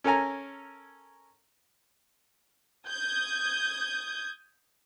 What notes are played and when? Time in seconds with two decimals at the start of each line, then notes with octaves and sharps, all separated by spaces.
0.04 C#4 A4 A#4 G#5 A#5
2.87 D#6 G6 G#6